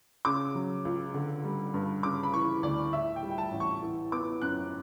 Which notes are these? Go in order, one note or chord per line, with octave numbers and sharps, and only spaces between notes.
C#3 D6
F#3
C#2
D3
G3
G2
C#3 D6
B5
E3 C#6
D2 D5
A2 E5
G5
G3
G5
A5
A1
C#6
E3
B3 D6
F#2 F#6